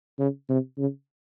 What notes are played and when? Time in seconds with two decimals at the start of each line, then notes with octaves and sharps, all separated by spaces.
0.19 C#3
0.49 C3
0.78 C#3